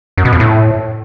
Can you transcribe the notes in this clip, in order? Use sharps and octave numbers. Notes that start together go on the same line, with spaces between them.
F#2
B2
F2
A2